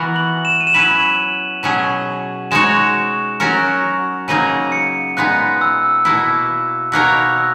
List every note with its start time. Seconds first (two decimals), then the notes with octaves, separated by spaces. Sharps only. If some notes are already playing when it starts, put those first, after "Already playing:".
Already playing: E3 B3 F#4 A#4
0.16 F#7
0.45 E7
0.60 D#7
0.67 E7
0.74 F#3 C#4 E4 B4 F#7
1.63 B2 F#3 C#4 G#4
2.51 G#3 D#4 F#4 C#5 E7
3.40 F#3 C#4 F#4 A#4
4.28 C#3 F#3 A#3 D#4 G#4 D#7
4.72 C#7
5.17 A#2 G#3 B3 D#4 F#6
5.61 E6
6.05 B2 A#3 E4
6.92 B2 A#3 D#4 A#4 C#5 F#6
7.38 E6